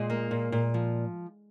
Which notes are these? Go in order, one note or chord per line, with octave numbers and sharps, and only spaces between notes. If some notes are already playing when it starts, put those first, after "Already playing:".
Already playing: A#2 G#3 G#4
A#3
A#2
A#2
F3